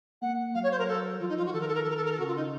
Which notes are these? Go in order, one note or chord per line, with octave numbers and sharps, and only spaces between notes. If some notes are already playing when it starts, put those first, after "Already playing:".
A#3 F#5
F#3 F5
C#5
C5
A#4
A4
F3 F4
D#4
F4
F#4
D#3 A4
A#4
A4
A#4
A4
A#4
A4
A#4
A4
C#3 F#4
F4
D#4